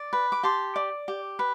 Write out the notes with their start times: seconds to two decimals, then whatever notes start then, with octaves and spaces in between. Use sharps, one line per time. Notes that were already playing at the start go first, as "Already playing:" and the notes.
Already playing: D5
0.13 B4
0.32 D6
0.43 G4 A5 C6
0.76 D5
1.08 G4
1.39 B4